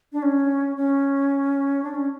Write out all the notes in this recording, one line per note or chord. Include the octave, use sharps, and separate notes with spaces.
D4
C#4
C#4
D4
C#4